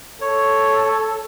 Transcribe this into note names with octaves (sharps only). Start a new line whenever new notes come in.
A4 C#5